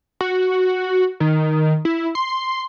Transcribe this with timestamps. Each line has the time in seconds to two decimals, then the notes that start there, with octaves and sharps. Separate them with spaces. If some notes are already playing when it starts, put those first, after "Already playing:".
0.21 F#4
1.20 D#3
1.85 E4
2.15 C6